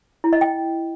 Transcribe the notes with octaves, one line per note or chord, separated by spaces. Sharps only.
E4
D#5
G5